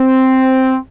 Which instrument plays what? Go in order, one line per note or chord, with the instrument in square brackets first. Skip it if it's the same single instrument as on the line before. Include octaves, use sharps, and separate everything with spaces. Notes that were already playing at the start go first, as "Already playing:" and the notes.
Already playing: [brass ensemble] C4